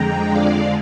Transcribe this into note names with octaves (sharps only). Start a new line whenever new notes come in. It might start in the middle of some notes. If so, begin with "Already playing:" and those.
Already playing: F2 D3 G#3 G5 A#5
D5 F5